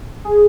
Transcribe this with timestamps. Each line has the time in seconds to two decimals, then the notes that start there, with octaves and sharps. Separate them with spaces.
0.25 G#4